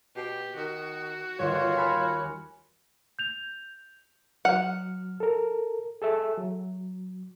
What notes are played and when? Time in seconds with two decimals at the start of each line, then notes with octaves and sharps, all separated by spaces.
0.15 B2 G4
0.56 D#3 F#4
1.39 G1 D#2 F4 C#5
1.76 G#5 B5 F6
3.19 G6 F7
4.45 F#3 F#5 F6
5.20 A4 A#4
6.02 G#4 A4 E5
6.38 F#3